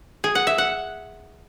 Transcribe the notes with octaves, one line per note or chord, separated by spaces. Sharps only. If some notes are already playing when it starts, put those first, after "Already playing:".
G#4
F#5
E5
F#5